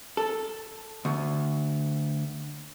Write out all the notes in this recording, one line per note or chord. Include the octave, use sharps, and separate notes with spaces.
A4
D2